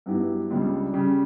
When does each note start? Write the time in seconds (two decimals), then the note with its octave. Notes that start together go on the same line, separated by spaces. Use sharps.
0.06 G2 F#3 B3 E4 G4
0.50 C#2 C#3 G3 D4
0.93 C#3 G3 C#4